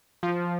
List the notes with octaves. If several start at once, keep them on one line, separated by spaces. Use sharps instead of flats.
F3